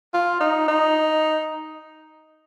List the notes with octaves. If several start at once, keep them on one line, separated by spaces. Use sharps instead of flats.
F4
D#4
D#4